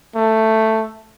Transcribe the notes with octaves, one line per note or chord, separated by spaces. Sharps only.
A3